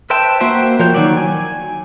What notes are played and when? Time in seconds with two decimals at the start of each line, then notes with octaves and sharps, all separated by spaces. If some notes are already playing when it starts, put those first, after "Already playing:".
0.10 B4 C5 E5 G5 A5
0.40 A#3 F#4 C5 E5 G5
0.79 F3 A#4 C#5 G6
0.94 D#3 F#3 D5
1.17 G#5